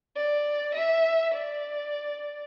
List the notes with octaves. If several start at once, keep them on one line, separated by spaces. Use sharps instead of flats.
D5
E5
D5